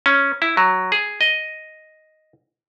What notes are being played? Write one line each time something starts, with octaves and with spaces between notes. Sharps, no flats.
C#4
E4
F#3
G#4
D#5